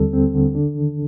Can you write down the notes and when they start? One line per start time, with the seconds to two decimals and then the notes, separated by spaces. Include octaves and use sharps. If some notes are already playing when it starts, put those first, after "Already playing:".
Already playing: D#2 D3 G3 C4 A4
0.13 C4
0.34 D3
0.55 D4
0.75 D#3